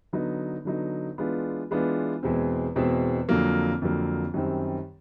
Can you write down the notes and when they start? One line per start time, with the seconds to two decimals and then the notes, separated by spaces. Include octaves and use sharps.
0.13 D3 F#3 B3 D#4
0.65 D3 F#3 B3 D#4
1.18 E3 G#3 B3 D4 F4
1.71 E3 G#3 B3 D4 F4
2.23 E2 B2 G#3 C4
2.76 E2 B2 G#3 C4
3.29 F2 D3 F#3 A#3
3.82 F2 D3 F#3 A#3
4.34 F#2 D#3 G3 C4